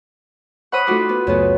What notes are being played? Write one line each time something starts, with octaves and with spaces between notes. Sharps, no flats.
C5 C#5 F#5 B5 C#6 D#6
A3 D#4 F4 F#4 D6
B3
C#2 F#2 C#3 A3 B3